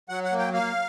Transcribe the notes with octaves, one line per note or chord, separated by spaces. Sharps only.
F#3 F#5
F#5
A#3
G5
A#3 F5